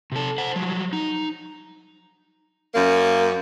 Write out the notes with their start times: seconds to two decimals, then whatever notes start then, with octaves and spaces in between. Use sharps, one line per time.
0.12 C3 A4
0.38 C5 F#5
0.56 F3 F#3
0.93 D#4
2.73 F#2 A#3